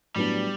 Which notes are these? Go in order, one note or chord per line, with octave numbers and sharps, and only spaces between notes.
A2 F#3 G3 B3 D4